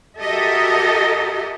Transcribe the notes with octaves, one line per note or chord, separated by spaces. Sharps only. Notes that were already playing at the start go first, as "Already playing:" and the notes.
F#4 G4 A4 A#4 D#5 E5